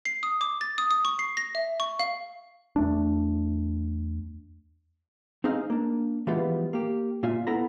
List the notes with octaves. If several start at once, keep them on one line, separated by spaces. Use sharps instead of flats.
C7
D#6
D6
A6
D#6
D#6
C#6
C7
A#6
E5
C#6
F5
E2 A3 D4
C4 D#4 G#4 D#5 F5
A#3 D4
E3 F3 G3 G#3 B3 F4
A#3 G4
A#2 F4 E5 G#5
B3 E4 A4 C5 A#5 B5